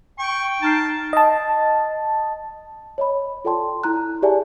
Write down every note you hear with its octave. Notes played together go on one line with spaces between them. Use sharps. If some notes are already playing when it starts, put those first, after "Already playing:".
G5 C#6
D#4 A5 A#5 F6 C7
D#5 A5
C#5 D#5 B5
F4 A4 D5 G5 A5 C6
E4 A#5 F#6
G4 G#4 D5 E5 G#5 A5